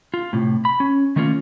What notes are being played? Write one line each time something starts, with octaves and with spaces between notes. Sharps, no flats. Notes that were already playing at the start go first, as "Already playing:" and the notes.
F4
A2 C3
B5
C#4
D#3 A3 A#3 C#4 F4